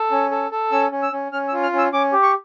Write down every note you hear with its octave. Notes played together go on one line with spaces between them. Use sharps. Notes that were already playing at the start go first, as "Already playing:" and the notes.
Already playing: A4
C#4
A4
A4
C#4 E6
C#4
E6
C#4
C#4 F6
E6
F4
F6
C#4
E6
C#4 D6
G4
C#6